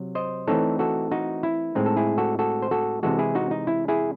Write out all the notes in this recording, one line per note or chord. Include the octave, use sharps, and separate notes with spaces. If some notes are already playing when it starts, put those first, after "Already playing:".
Already playing: C3 F#3
C5 D#5
E3 A3 C4 D#4 A4 C#5
F#4 A4
D#4 F#4
E4
A2 G#3 C4 D#4
A4
E4 G#4
F#4 A4
F#4 A4
C5
F#4 A4
C3 E3 G#3 F#4 A4
E4 G#4
D#4 F#4
D#4
E4
E4 G#4